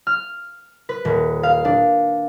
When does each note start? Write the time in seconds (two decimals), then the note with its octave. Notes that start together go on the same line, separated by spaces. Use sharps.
0.07 F6
0.89 B4
1.05 D#1
1.43 F5
1.65 D4